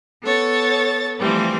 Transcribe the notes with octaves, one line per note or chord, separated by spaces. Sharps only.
B3 A4 C#5 A6
E3 F3 G3 A3 C4